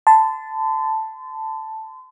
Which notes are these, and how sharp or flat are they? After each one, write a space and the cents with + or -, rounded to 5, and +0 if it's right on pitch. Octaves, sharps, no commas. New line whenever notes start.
A5 +0 C6 -40